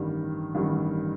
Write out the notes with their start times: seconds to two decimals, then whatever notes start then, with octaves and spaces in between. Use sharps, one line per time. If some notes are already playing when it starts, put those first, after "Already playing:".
Already playing: A1 G2 D#3 G3
0.55 A1 G2 D#3 G3